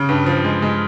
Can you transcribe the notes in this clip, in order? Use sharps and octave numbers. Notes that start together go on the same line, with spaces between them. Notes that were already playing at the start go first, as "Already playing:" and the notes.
Already playing: C#3
G2
F3
G#3
G#3